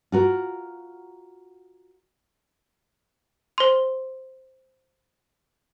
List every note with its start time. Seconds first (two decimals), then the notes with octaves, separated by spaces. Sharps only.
0.12 F4 F#4 A#4
3.58 C5 C6